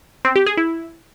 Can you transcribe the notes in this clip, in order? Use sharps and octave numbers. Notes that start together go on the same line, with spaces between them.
C4
G4
G#4
E4